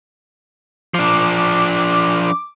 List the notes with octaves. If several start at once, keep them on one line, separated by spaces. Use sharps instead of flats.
F3 D4 D6